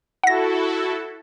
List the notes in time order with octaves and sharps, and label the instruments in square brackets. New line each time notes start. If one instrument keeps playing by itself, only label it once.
[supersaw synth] E4 F#4 A4 [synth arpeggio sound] F#5 A#6